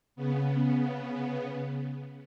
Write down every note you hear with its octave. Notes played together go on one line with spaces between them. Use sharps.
C#3 B3